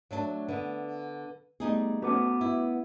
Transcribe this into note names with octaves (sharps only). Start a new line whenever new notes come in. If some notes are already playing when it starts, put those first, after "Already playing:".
F#3 A3 D4
D3 B3 B4
G3 A3 B3 D#4 G#4
A3 B3 C#4 F#4 B4 D6
E4